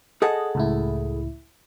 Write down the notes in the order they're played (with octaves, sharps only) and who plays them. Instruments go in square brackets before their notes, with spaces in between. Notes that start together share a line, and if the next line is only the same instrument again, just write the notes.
[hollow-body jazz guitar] G#4 A4 F#5 [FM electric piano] D#5
[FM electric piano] C#2 A2 E4